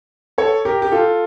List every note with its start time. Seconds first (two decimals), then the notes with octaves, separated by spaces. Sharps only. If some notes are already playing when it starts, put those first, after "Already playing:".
0.38 A4 C#5
0.65 G4 A#4
0.82 G4
0.92 F4 A4